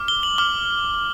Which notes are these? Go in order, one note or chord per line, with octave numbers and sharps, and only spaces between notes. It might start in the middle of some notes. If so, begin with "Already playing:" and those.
Already playing: D6 F6
G7
F#7
D6 F6 G7